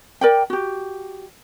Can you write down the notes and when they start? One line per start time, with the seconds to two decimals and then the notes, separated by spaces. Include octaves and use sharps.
0.21 A#4 D5 G5
0.50 F#4 G4